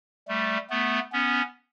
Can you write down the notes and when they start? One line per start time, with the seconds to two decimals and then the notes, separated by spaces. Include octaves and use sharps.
0.28 G3 A3
0.70 A3 B3
1.12 B3 C#4